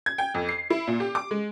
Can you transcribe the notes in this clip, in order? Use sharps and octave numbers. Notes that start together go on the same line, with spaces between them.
G#6
G5
F2
C7
E4
A#2
G4
D6
G#3